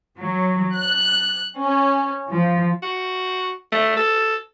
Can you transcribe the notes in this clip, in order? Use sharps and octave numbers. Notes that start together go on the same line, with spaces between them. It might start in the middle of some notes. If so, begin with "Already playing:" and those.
F#3
F#6
C#4
F3
F#4
A3
A4